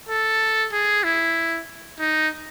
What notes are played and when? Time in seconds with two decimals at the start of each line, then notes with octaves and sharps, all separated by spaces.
0.09 A4
0.73 G#4
1.04 E4
2.00 D#4